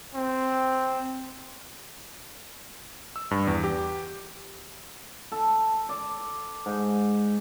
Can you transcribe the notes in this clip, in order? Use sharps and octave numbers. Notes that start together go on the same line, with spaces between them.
C4
E6
G2
E2
G4
A4
D5
G#2